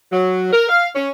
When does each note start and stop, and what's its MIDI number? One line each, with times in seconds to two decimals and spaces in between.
0.12 0.51 54
0.52 0.66 70
0.68 0.89 77
0.96 1.10 61